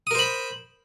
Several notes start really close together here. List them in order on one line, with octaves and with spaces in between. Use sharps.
D#6 A#4 C5 B5